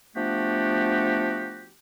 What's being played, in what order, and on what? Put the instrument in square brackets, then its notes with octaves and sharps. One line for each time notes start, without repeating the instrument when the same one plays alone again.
[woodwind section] F3 A3 B3 D4 F#4 G4